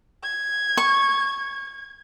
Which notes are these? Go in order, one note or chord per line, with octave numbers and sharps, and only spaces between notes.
G#6
C#6